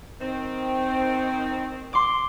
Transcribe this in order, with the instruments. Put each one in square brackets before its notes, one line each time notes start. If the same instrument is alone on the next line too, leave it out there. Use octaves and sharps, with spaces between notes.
[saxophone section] D#3 C4
[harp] C6 D6